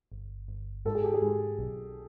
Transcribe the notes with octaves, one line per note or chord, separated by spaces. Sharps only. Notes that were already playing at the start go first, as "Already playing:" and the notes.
G1
G1
G#2 A4
G#4
G4
G#4
G#2
B1